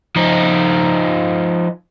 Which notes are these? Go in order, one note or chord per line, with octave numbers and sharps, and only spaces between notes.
F3 D#4